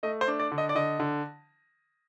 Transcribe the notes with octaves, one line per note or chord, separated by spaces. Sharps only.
A3 D#5
C5
D4
D5
D3
D#5
D5
D3 D#5
D3